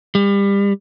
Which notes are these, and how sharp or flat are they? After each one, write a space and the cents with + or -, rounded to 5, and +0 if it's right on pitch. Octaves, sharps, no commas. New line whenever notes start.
G3 +30